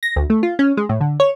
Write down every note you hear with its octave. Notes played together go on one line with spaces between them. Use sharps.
A#6
D2
A3
F4
C#4
G#3
A2
D3
C#5